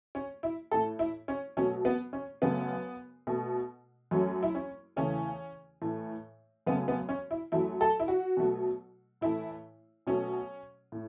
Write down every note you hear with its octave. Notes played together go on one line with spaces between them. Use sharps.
C#4
E4
A2 A3 A4
E4
C#4
B2 F#3 A3 C#4
B3
C#4
F#2 C#3 A3 B3
B2 A3
F#2 F#3 A3 C#4
E4
C#4
E2 C#3 E3 A3 C#4
A2 E3 A3
F#2 C#3 A3 B3
B3
C#4
E4
F#2 F#3 A3 E4
A4
E4
F#4
B2 F#3 A3
A2 E3 A3 E4
B2 F#3 A3 C#4
A2